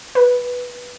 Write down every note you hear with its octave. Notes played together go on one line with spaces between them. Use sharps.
B4